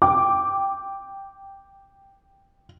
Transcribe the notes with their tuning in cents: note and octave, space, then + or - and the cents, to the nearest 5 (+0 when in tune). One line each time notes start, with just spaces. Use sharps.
G5 +0 D6 +0